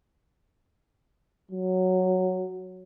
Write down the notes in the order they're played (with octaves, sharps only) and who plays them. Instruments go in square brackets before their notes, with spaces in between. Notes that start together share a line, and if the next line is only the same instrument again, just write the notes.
[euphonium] F#3